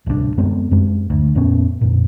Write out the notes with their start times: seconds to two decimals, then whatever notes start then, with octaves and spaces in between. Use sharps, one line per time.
0.06 D1 C2 B2 D4
0.37 F#2 G#3 B3 C4
0.71 F#2 G#3
1.10 D2
1.35 F2 A#2 B3 C#4
1.81 F2 A#2